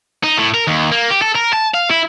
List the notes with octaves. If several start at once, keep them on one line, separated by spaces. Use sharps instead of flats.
D#4
A2
A#4
D#2
A#3
G4
A4
A#4
A5
F5
E4